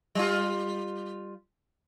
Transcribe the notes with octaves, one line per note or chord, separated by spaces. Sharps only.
G3 F4